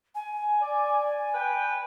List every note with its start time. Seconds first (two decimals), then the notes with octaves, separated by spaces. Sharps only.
0.15 G#5
0.60 D5
1.34 B4 G5